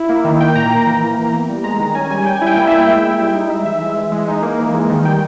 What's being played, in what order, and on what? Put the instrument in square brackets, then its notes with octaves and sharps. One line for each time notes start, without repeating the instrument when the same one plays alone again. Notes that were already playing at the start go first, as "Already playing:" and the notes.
Already playing: [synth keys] E4
A#3
D#3
A#3 G5
A#2 A#5
A#3 A#5
E3
A#3
E3
B3
G3
G#3 A#5
D#3
C#4 G#5
G3 G#5
G3 G5
G#5
E4
G5
A#3 G5
E5
E4
G5
G#3
E4
G3
D#4
G#3 E5
E3 E5
G#3
E3
G#3
D#4
A#3
E3
G#3
D#3
G3 G5